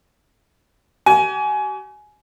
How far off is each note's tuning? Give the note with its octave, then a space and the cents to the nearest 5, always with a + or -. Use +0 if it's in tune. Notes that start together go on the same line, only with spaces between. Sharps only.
G4 -45 G#5 +20